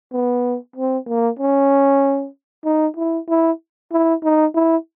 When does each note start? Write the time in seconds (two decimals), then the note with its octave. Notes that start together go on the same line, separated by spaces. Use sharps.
0.13 B3
0.76 C4
1.07 A#3
1.39 C#4
2.65 D#4
2.97 E4
3.29 E4
3.92 E4
4.24 D#4
4.54 E4